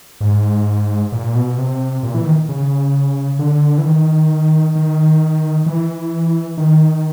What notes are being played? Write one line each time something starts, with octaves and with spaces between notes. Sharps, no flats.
G#2
A#2
B2
C3
A#2
E3
D#3
C#3
D3
E3
D#3
D#3
E3
D#3